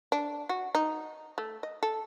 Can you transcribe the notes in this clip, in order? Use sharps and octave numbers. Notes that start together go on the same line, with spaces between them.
D4
F#4
D#4
A3
D#5
A4